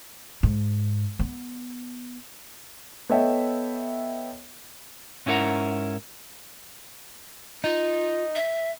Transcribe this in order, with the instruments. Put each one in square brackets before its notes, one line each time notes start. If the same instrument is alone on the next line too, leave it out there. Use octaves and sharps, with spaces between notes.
[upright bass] G#2
B3
[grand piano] B3 A4 C#5 D#5 E5 G5
[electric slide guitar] G#2 C#4 E4 A#4 F#5 A#5
[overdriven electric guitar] D#4 [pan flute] F4
[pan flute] E5